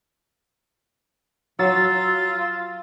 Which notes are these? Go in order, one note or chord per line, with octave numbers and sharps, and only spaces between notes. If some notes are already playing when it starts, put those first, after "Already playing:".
F#3 F4 E6 A6